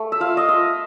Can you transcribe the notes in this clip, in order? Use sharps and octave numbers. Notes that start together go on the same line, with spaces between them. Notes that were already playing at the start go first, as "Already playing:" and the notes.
Already playing: A3
E5
F4 F5
D#5
F4 E5